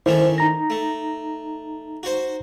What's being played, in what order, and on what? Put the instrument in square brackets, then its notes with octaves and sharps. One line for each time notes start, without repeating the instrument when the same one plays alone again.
[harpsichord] D#3 A3 C#4 [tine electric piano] E4 C5
[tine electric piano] D#4 A#5 A#6
[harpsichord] A3
F#4 C5